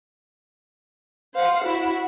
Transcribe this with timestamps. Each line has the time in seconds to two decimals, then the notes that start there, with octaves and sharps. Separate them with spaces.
1.33 C5 F5 F#5
1.63 E4 F#4